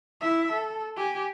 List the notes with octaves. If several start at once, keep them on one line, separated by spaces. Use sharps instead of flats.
E4 E5
A4
G4 G#5